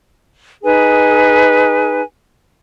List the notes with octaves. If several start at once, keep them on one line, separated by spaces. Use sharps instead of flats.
D#4 G#4 B4 G#5